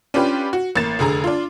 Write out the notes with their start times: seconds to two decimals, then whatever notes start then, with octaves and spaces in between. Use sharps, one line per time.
0.14 C#4 D4 F4 G4 B4
0.53 F#4
0.76 A1 A#3 A6 E7
0.99 F1 D3 G#4 A#5
1.24 D4 F4